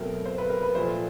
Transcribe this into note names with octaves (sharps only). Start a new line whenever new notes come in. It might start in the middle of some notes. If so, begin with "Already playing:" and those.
Already playing: B2 F#3 A3 C4 A#4
C5
B4
A#4
B4
A#2 F3 A3 C5